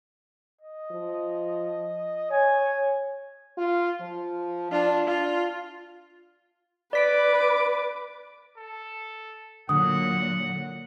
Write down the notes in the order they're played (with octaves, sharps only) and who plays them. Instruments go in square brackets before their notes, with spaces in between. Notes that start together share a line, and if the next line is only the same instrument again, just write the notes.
[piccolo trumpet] D#5
[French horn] F3
[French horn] C#5 [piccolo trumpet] G#5
[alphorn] F4
F3
[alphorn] D4 [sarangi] F4
[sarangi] F4
[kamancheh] B4 D6 [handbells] D5 B6 D7
[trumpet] A4
[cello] A#2 F#3 [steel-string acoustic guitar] D3 [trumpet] F#5 [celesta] D#6